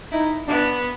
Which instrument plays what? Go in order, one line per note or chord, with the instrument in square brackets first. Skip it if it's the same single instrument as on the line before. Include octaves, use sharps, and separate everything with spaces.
[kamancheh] D#4 [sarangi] E4
[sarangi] B3 [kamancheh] D4